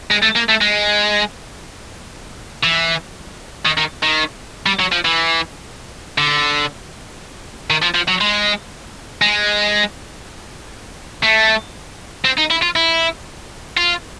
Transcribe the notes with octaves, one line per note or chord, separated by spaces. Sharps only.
G#3
A3
A#3
A3
G#3
E3
D#3
D#3
D#3
G3
F#3
F3
E3
D3
D#3
F3
F3
F#3
G#3
G#3
A3
C4
D#4
E4
F4
E4
F4